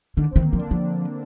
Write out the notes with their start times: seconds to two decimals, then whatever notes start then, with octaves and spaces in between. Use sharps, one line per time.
0.17 D3 D#3 D4
0.31 C4
0.36 D#3
0.45 A#3
0.53 F3
0.58 D3 D4
0.71 F3